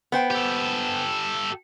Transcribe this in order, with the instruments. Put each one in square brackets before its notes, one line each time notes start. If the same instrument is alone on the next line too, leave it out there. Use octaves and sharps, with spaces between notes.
[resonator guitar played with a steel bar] B3 C5 G5
[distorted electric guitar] G4 A4